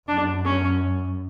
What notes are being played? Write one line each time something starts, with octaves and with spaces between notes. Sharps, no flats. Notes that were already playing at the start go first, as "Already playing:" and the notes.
F#2 D4
C#4